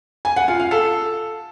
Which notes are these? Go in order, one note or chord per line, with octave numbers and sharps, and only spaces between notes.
G#5
F#5
F4
F5
A4